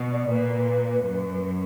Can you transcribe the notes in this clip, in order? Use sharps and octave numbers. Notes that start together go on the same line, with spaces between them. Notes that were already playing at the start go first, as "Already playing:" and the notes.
Already playing: B2
D5
A#2 B4
F#2